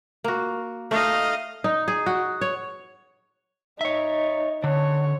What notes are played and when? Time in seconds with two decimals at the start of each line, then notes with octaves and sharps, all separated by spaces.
0.24 A#3 F#4
0.91 A3 D#4 D#5 F5
1.64 D#4
1.88 G#4
2.06 F#4
2.41 C#5
3.81 D#4 C#5 E5
4.64 D3 C#5